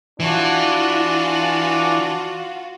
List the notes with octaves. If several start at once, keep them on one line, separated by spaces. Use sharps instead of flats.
E3 D4 F4 F#4